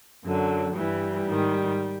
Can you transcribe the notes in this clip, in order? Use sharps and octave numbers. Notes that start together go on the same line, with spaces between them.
F#2 D3 F#3
G2 E3 G3
G#2 D#3